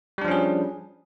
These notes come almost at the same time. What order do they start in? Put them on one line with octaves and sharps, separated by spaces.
G3 D4 F3 C#4 G#4